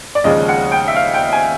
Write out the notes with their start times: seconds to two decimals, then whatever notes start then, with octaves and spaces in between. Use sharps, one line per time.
0.15 D5
0.24 D#2 C#3 F3 G#3 D#5
0.48 F#5
0.72 G5
0.88 E5
0.96 F5
1.14 G5
1.32 G#5